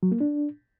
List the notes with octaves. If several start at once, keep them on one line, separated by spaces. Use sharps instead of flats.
F#3
A#3
D4